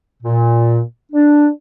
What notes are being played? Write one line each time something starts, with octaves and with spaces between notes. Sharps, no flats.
A#2
D4